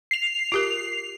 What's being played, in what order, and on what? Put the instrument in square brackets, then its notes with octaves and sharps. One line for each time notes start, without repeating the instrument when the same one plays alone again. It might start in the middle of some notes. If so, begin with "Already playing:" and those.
[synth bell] C7 F7
[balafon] F4 G4 A#4